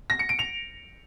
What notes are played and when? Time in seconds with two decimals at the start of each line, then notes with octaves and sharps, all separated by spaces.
0.10 A#6
0.19 C#7
0.29 D7
0.39 F7